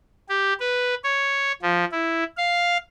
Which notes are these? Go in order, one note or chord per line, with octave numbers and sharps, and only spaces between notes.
G4
B4
C#5
F3
E4
F5